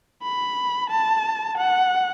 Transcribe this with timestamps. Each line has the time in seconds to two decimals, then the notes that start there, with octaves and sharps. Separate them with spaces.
0.23 B5
0.90 A5
1.58 F#5